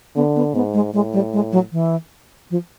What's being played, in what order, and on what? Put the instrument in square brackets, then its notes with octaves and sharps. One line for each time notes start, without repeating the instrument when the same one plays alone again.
[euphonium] D3 [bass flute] B3
[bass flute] B3
[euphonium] G#2 [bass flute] B3
[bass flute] G#3
[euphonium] A2 [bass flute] G#3
[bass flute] G3
G#3
F#3
E3
F3